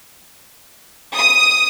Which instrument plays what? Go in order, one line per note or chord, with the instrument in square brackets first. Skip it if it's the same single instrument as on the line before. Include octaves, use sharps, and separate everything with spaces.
[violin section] D#6